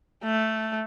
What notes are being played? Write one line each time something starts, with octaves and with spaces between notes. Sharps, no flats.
A3